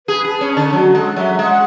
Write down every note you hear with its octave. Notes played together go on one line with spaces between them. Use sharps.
G#4 B4
G#4 A5
C#4
A5
D3
F#3 F#4
G#3 A4
F#3 E5
G#3 F#5